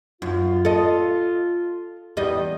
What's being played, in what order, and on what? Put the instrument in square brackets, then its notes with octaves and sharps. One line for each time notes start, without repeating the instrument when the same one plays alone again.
[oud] F#2 [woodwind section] F4
[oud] A4 D#5
E2 G3 D#5